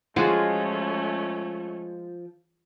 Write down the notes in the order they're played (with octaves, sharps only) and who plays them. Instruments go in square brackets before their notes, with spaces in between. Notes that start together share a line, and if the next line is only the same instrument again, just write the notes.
[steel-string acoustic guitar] F3 [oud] G#3 F#4 [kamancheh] A3 C#4 [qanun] F4 G#4